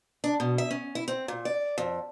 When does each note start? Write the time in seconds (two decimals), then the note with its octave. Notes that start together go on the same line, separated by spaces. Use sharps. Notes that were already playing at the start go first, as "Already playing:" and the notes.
0.24 D4
0.40 B2
0.58 E5
0.71 C#4
0.95 E4
1.08 C4
1.28 A#2
1.45 D5
1.78 F2